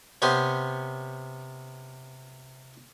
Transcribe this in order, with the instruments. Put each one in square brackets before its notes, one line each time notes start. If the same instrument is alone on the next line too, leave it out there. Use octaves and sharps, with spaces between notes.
[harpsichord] C3 B3 C#4 C5